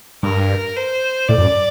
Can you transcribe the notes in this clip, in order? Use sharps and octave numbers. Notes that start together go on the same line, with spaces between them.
G2 A#4
C5
A2 D5
F#2